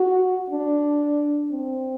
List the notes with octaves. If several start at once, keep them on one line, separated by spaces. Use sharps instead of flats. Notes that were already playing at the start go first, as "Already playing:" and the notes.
Already playing: F#4
D4
C4